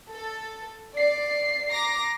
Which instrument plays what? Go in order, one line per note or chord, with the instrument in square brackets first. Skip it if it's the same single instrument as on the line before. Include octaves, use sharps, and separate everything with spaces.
[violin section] A4
[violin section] D5 [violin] C7
[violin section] A#5 D6 A#6